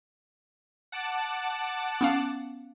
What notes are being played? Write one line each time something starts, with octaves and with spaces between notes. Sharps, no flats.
F#5 A5 D6
B3 C#4 F5